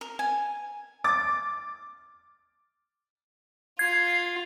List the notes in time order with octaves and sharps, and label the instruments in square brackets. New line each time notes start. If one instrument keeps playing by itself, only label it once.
[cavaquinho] A#4
G#5
[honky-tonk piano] D6 A6
[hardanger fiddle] F4 [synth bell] G#6 [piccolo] C7